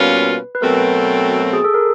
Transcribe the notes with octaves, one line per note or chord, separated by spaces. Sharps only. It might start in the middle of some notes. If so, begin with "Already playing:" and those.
Already playing: B2 G3 A#3 C#4 F4 B4
B4
B2 F#3 A3 C4 A#4
G#4
A4
A#4